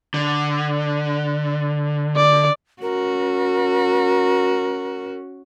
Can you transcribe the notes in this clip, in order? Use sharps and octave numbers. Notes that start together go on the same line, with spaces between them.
D3
D5
C#4 F#4 A#4